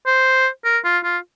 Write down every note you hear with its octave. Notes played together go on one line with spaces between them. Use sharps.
C5
A#4
F4
F4